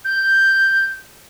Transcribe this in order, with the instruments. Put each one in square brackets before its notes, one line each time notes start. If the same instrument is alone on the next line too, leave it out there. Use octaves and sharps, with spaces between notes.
[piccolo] G6